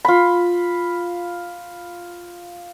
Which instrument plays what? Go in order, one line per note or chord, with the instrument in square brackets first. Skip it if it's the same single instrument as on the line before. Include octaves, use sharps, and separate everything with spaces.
[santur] F4 B5